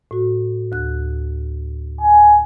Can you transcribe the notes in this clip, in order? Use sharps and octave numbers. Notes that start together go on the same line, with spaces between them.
A2 F#4
D2 F#6
G#5